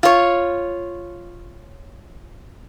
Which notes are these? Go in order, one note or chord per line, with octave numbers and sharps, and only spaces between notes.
F4 C#5